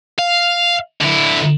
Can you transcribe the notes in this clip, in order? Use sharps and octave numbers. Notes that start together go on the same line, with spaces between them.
F5
D3 E4